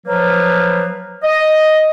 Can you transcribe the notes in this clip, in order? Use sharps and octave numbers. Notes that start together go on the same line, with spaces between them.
F3 F#3 A#3 B4
D#5